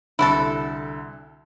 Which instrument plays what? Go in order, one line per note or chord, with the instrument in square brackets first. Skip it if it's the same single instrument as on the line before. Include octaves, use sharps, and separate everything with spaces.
[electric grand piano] C2 D3 [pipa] E4 F#4 A4